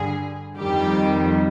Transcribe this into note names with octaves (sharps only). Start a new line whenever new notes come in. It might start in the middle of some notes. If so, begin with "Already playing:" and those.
Already playing: G2 D3 G3 G#4
F2 D#3 G3 G4